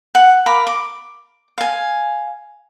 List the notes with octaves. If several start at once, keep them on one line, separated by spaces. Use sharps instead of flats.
F#5
A#4 F5 B5 D6
D6
F5 G#5